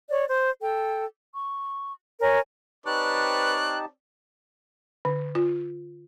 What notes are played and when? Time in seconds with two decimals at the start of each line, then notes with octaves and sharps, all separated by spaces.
0.10 C#5 D5
0.28 C5
0.62 A4 G5
1.33 C#6
2.21 A#4 C#5 G#5
2.86 C4 D#4 G4 B4 C#5 D5 A5 F#6
5.05 D3
5.35 F4